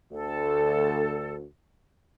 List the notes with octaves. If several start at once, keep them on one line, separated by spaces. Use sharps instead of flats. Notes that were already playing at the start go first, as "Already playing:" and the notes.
D2 A4